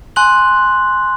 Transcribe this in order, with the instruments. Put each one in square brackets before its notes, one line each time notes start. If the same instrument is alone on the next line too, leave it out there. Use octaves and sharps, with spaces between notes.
[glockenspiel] G#5 C6 F#6 F#7